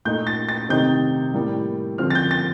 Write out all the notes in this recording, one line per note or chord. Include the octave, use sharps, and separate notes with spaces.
A#2 A3 D#4 G6
A6
A6
C3 D#3 A3 C4 D#4 G6
A2 G3 A#3
D3 F3 C4 F6
A6
G6
A6